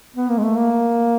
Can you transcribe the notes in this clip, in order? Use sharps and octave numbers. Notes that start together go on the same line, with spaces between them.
B3
A#3
G#3
A3
A#3